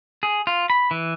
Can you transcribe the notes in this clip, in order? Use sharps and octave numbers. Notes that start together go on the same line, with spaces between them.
G#4
F4
B5
E3